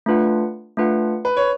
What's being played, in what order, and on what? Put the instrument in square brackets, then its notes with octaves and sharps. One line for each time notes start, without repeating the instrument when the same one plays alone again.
[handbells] A3 D4 F4 B4 F#5
A3 D4 F4 B4 F#5
[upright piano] B4
C#5